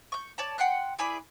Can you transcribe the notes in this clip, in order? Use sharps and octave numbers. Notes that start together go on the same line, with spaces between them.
C#6 G6
C#5 D5 A5
F#5 G5 C6 F#6
E4 G#4 B4 D5